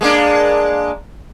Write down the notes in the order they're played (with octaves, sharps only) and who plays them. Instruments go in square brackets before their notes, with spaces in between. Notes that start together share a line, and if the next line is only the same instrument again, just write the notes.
[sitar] G#3 A#3 D4